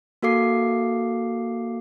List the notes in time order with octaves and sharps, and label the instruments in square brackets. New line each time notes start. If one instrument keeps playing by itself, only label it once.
[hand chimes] A#3 F#4 A4 F5 D6 C7